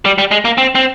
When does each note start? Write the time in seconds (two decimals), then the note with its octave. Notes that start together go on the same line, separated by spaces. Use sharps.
0.05 G3
0.18 G3
0.31 G#3
0.45 A#3
0.58 C4
0.75 C4